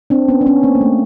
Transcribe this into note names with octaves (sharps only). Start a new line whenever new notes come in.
C4 D4
B3 C#4
D4
B3 C#4
A#3 C4
A#3
A3